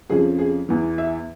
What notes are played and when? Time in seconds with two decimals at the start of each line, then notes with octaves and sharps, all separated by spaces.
0.10 F2 C#3 F3 G#4
0.39 G#4
0.69 E2 E3
0.98 E5